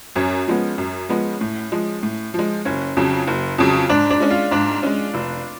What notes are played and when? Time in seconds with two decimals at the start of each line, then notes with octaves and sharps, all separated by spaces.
0.16 F#2 C#4
0.48 F3 G#3 B3
0.78 F#2
1.09 F3 G#3 B3
1.41 A2
1.72 F3 G#3
2.03 A2
2.34 F3 G#3
2.65 F#1 C#4
2.97 F2 C#3 F#3
3.27 F#1
3.58 F2 C#3 F#3
3.89 G#2 D4
4.11 D4
4.20 G#3 C#4
4.31 F4
4.51 G#2 D4
4.83 G#3 C#4
5.14 F1